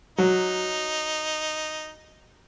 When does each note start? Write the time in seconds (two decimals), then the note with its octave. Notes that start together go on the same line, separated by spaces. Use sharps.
0.18 F#3 D#4